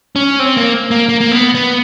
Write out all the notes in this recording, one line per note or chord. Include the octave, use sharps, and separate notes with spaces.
C#4
C4
A#3
A#3
A#3
A#3
B3
B3